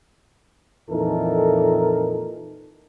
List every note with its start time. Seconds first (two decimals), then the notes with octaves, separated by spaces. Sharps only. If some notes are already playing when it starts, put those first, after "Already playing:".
0.90 F2 A#2 E3 D#4 A4 A#4